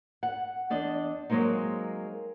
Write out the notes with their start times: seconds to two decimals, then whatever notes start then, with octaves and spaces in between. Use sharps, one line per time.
0.23 F#5
0.70 E2 D4 D#5
1.30 F#3 G#3 A#3 C4 D#4